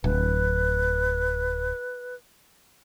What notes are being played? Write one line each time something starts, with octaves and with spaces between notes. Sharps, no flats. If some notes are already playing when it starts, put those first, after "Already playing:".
D1 B4